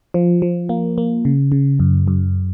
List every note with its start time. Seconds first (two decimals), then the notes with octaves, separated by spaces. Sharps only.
0.14 F3
0.42 F3
0.69 A#3
0.98 A#3
1.25 C#3
1.52 C#3
1.80 F#2
2.08 F#2